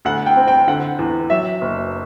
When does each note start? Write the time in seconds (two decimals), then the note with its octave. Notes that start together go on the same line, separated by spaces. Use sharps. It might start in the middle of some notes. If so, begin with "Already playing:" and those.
0.05 D2 F#5
0.26 G5
0.36 C4
0.48 G5
0.68 D3 F#5
0.99 E2
1.30 F#3 E5
1.61 F#1